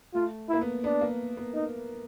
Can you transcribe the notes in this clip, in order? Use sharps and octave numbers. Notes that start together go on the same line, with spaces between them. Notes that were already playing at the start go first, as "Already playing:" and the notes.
A3 F4
A#3 E4
B3
B3 D4
A#3
B3
D#4